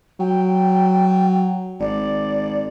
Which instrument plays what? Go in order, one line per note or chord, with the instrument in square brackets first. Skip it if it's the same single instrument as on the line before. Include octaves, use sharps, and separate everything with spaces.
[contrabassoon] F#3 [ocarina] G5
[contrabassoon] G#1 [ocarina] D5